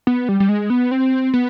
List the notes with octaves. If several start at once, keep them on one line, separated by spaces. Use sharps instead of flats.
B3
G3
G3
G#3
B3
C4
B3